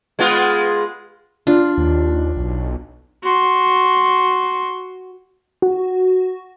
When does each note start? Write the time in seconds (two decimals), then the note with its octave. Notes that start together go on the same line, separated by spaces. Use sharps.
0.19 G#3 B3 F4
1.47 D4 F4
1.78 D#2
2.36 B1
3.23 F#4 C6
5.62 F#4